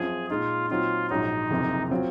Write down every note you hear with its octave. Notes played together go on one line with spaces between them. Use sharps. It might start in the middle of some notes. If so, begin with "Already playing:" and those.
Already playing: F#2 F3 C4 F4 G#4
A#2 G#3 D#4 F4
A#2 F#3 C4 D#4 F4
A#1 G#2 F#3 C#4 D#4
F#1 F2 C3
F#3 C4 F4